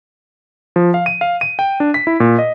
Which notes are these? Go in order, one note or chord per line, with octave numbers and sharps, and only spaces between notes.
F3
F5
D#7
F5
D#7
G5
D4
B6
E4
A#2
D#5